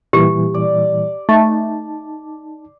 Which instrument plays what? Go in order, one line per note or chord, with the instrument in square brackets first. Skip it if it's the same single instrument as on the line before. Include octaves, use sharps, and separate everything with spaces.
[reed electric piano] A#2 E3 G3 [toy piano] G4
[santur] D5
[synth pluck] A3 [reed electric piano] D#4 A5